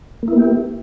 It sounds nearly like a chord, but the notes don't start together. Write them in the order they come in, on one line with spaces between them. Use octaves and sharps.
A#3 E4 B3 G4